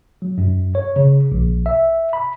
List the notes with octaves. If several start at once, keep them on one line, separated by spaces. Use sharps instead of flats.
F#3
F#2
C#5
C#3
A#1
E5
B5